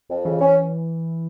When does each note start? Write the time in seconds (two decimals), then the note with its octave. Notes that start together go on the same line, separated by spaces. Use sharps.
0.10 F2
0.25 C#3 E3
0.41 C#4